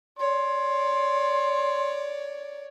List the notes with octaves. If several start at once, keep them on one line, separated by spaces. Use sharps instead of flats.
C#5 D5 C6